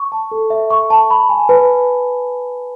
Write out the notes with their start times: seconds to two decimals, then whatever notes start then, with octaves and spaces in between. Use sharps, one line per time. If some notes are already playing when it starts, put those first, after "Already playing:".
Already playing: C#6
0.12 A5
0.31 A4
0.50 E5
0.70 C#6
0.90 A5
1.10 B5
1.29 G#5
1.49 B4